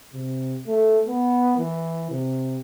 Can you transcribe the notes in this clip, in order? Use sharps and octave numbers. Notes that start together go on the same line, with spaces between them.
C3
A3
B3
E3
C3